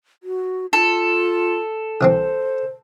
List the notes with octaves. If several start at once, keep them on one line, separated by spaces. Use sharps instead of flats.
F#4
F4 A4
C2 E3 C4 C5